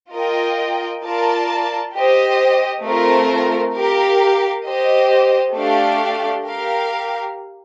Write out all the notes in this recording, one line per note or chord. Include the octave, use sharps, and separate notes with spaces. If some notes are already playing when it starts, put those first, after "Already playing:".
F4 A#4 D#5 G5
F4 A#4 D5 A5
G4 C5 D#5
A3 C4 F4 A#4
G4 A#4 F5
G4 C5 D#5
A3 D4 G4 D5 F5
G4 A#4 F5